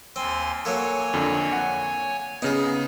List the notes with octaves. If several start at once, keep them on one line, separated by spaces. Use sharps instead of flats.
D#2 C4 G#5 C6
F#3 A#3 A4 C#5 G#5
F2 D3
F#5
C#3 B3 D#4 G#4